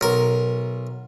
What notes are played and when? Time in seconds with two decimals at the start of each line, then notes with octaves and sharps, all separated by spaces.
0.01 B1 A#4